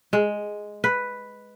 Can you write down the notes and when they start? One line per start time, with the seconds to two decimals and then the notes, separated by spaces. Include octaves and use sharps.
0.13 G#3
0.84 B4